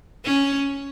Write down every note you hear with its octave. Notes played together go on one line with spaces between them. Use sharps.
C#4